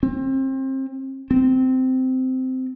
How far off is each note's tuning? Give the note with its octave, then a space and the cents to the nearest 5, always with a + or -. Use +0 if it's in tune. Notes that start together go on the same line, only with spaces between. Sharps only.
C4 +30
C4 -15